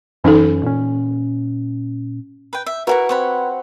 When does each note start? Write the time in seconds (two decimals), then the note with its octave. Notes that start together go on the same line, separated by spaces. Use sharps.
0.24 F#2 E3 C#4 D#4 A4
0.63 A#2 C#4
2.53 B4 G5
2.66 E5
2.87 E4 F#4 G#4 A#4 B4 F#5
3.09 C4 C#5 F#5 B5